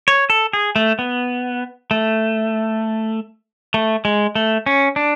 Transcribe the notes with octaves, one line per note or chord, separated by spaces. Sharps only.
C#5
A4
G#4
A3
B3
A3
A3
G#3
A3
C#4
D4